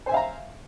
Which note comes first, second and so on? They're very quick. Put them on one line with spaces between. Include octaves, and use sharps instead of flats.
C5 G#5 E5 F5 A#5